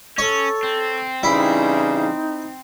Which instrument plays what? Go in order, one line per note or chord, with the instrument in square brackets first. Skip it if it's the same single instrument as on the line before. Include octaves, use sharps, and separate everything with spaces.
[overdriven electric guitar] C#4 [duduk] A4 [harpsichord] C#5
[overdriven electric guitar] C4
[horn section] C#3 E3 G3 [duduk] D#4 [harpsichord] E4